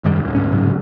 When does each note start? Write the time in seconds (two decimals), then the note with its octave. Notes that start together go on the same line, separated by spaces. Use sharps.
0.04 E1 F#2 D#3 G3
0.19 D#1
0.35 D2 G#2 C#4
0.52 G#2 C#3 F#3